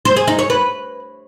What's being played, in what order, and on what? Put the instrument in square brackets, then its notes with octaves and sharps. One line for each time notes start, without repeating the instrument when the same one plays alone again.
[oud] C5
G#4
D#4
C#5
B4